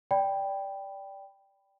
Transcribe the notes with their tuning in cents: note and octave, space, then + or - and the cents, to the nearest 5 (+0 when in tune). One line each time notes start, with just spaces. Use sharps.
D5 -10 G5 +0 B5 +0